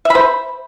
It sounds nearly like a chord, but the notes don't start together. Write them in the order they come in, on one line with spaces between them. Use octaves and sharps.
E5 B5 C5